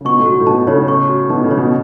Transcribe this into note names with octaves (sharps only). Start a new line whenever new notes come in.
C#3
B2 C#6
A2
F#4
A2
B2 A5
A2 C#3 C#5
C#6
F#4
B2 E3 A5
A2 C#3
C#5
B2